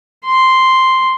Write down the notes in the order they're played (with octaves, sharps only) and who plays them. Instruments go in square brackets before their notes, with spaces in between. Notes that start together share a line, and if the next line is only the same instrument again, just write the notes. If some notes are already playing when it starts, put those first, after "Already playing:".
[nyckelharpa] C6